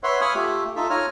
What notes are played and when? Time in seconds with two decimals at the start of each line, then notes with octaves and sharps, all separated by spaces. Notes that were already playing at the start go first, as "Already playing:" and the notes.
0.03 B4 C#5 E5 F#5 C6
0.21 F5 G#5 B5 C#6 D#6 F6
0.35 A3 F4 G4 E5
0.76 D#4 F4 A4 E5
0.90 F4 C#5 G#5 A#5 F6